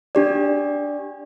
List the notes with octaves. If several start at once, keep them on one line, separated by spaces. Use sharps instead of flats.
D4 G4 D5